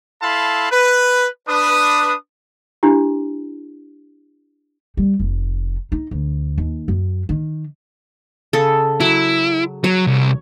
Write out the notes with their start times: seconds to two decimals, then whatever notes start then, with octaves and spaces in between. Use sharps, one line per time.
0.22 E4 A4 F5 A5 B5 C6
0.71 B4
1.48 D4 B4 D#6
2.83 D4 E4 G4
4.97 G3
5.19 F1
5.92 D#4
6.11 D2
6.58 D#2
6.88 F#2
7.29 D#3
8.53 C#3 A4
9.00 F#3 E4
9.84 F#3 C#5
10.07 C2